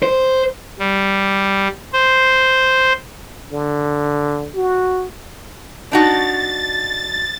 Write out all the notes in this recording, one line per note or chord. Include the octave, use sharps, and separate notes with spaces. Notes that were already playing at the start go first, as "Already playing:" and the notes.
C5
G3
C5
D3
F#4
D4 D#4 F#4 A6